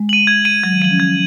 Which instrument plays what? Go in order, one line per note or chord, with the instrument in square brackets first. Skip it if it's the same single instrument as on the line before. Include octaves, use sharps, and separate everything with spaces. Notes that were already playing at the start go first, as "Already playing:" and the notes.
Already playing: [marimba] G#3
[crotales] D#7 F#7
G#6
D#7 F#7
[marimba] F#3 [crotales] G#6
[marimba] D#3
[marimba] F3 [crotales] D#7 F#7
[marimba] C#4
[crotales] G#6